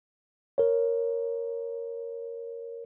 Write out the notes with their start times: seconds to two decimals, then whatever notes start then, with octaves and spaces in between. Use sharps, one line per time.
0.58 A#4 C#5